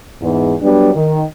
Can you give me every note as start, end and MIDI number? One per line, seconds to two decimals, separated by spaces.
0.22 0.55 40
0.22 0.55 44
0.61 0.90 54
0.61 0.90 55
0.61 0.90 59
0.61 0.90 62
0.96 1.23 51